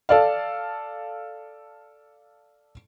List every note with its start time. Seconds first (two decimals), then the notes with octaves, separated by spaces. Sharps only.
0.09 A4 D5 F5